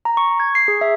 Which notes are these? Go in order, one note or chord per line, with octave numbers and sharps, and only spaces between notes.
A#5
C#6
G#6
C7
G#4
E5